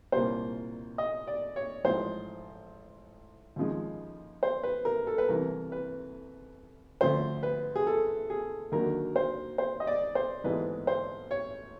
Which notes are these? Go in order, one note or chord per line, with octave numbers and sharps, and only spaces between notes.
C2 A#2 G3 A#3 C5
D#5
D5
C#5
A1 G#2 F3 C5
D#2 C#3 F3 G#3
C5
B4
A#4
A4
B4
C2 C3 E3 A#4
B4
D2 C#3 F3 A3 C5
B4
G#4
A4
G#4
D#2 D3 F#3 A#3 A#4
C5
C5
D#5
D5
C5
A1 G#2 E3 G#3 B3 B4
C5
C#5